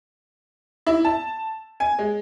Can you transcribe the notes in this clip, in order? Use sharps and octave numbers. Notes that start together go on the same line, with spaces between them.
E4
A5
G#5
G#3